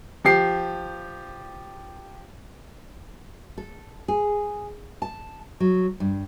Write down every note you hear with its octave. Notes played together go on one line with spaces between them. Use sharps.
F3 G4 C7
A4
G#4
A5
F#3
G2